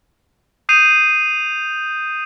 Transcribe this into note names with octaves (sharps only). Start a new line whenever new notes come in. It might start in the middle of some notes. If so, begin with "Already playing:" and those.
D#6 G6 C7 D#7 F7